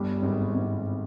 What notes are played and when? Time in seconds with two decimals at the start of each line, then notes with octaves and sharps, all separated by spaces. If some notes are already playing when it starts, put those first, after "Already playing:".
Already playing: G1 G3
0.22 G#1
0.54 G#1